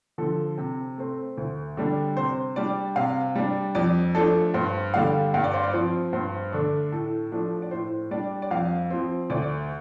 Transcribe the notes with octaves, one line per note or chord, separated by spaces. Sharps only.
D3 F3 A4
C3
A3 C4
D2
D3 G3 D4
C3 C5
G3 D4 D5
C3 F5
G3 D4
F2 D5
F3 A3 D4 A4
G2 C5
D3 G3 D4 F5
G2 F5
D5
C5
D5
F3 C4
G2 C5
D3 A3 D4
A2 A4
F3 A3 D4
D5
A2 C5
G3 D4 D5
D5
F2 F5
F3 C4
D2 D5